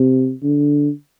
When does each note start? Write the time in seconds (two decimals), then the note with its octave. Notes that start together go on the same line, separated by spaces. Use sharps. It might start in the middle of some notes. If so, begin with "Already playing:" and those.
Already playing: C3
0.43 D3